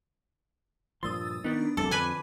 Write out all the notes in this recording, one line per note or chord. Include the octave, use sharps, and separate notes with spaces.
G2 A#2 F3 C6 D#6 E6 A6
D#3 B3 D4 D#4 B4
F1 C2 G2 C3 F#3 A4 A5 D6
F2 D3 B4 G#5